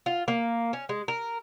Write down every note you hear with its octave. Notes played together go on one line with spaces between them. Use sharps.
F4
A#3
C#4
G#3
A#4